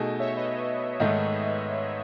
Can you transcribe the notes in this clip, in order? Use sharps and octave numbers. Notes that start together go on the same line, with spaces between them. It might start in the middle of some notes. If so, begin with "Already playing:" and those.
Already playing: B2 A3 D#4 G#4
C#5 E5
B4 D#5
G#2 D#3 A3 D#4